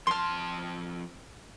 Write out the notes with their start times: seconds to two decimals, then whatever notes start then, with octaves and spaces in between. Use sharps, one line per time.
0.07 F2 A5 C6 F6